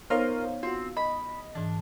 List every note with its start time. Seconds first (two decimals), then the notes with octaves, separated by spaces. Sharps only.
0.10 B3 D#4 F4 A#4 C5 C#5 D#5 F5
0.63 C4 F4 F#4
0.97 D#5 B5
1.55 G#2 E3 D4